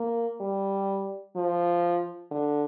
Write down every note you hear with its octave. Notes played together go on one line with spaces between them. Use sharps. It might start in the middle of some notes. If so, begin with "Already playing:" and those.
Already playing: A#3
G3
F3
D3